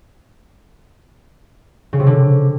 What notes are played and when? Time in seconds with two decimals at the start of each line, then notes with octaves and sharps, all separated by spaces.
1.93 C#3
2.00 C3
2.07 D3